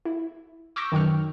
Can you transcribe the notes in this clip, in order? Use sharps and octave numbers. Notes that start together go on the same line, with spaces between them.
E4
C#6 D6 E6 G6 A#6
F#2 D#3 G5 C#6 F6